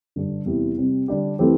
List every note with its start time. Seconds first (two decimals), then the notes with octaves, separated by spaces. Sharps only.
0.16 G2 D3 G3 D4
0.46 E2 C3 G3 E4 G4
0.77 C3 G3 C4
1.08 D3 G3 D4 G4
1.39 E3 A3 C4 G4